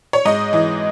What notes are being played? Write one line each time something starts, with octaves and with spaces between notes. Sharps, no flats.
C#5
G#2 D#5
E3